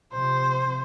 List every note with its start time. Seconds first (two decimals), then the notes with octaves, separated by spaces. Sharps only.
0.12 C3 F3 C4 C5